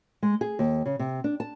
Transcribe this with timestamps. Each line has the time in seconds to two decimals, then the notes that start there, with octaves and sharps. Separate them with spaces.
0.23 G#3
0.41 G#4
0.59 D#2
0.86 C#3
0.99 C3
1.24 D4
1.40 A5